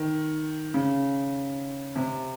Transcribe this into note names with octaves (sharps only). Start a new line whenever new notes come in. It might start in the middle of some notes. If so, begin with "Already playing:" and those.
Already playing: D#3
C#3
C3